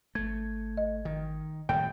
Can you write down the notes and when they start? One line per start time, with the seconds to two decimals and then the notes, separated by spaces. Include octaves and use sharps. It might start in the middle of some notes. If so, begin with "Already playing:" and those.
0.15 G#1 A3 G#6
0.77 D#5
1.05 D#3
1.69 A2 D#3 G3 G5